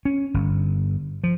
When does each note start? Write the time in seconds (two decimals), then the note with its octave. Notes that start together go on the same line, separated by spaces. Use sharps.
0.05 C#4
0.34 G1
1.24 F3